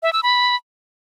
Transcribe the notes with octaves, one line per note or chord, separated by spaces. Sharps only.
E5
E6
B5